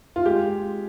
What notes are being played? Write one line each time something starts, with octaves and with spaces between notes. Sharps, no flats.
F4
G#3 G4